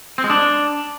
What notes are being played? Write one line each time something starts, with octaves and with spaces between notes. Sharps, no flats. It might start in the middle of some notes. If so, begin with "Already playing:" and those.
C4
G#3
D4